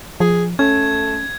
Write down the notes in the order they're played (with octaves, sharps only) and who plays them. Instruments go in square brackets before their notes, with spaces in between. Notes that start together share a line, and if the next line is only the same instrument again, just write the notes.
[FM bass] F3 [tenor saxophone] G#4
[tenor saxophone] A3 [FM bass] C#4 [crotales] G#6